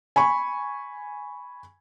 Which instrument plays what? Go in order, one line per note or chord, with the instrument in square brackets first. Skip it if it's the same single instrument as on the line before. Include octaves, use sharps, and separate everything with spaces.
[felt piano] G#5 B5 C#6